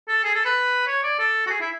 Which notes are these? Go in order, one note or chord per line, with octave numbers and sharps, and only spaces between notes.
A4
G#4
A4
B4
C#5
D5
A4
F#4
G#4
E4